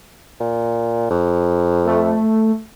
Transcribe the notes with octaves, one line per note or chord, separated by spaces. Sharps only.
A#2
F2
A3